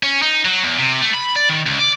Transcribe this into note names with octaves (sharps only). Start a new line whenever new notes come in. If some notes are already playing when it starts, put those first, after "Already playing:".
C#4
D#4
F#3
E2
C3
A3
B5
D5
D#3
C#2
D5